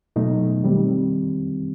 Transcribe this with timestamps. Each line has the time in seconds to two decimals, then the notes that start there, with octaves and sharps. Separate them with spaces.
0.16 B2 F#3 A3 D#4
0.64 D#3 G3 C4